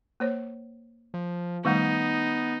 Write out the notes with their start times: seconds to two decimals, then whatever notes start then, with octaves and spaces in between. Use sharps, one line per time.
0.20 A#3 C5 C#5
1.14 F3
1.65 D#3 G3 A3 B3 D#4